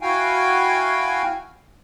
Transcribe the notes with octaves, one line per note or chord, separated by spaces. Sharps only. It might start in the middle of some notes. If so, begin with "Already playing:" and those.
E4 F#4 F5 G5 G#5